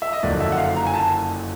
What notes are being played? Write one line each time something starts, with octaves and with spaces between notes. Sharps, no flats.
E5
D#5
F#1 F2 D3 F#3 A#3 D5
E5
F#5
F5
A#5
G#5
A5